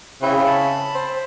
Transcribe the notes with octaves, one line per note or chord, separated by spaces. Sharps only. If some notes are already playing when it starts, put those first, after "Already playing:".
C#3 C4 E4
A5 B5
C5